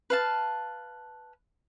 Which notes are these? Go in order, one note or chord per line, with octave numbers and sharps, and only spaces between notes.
B4 F5 A5